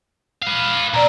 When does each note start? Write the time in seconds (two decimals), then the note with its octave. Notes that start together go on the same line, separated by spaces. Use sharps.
0.43 B4 F5
0.94 B2 C4 D5 A#5